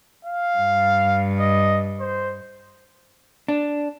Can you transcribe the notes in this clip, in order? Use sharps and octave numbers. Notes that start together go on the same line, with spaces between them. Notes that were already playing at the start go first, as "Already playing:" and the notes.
F5
G2
D#5
C5
D4